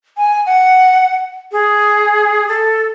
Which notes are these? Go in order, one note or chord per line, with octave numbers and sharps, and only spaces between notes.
G#5
F#5
G#4
A4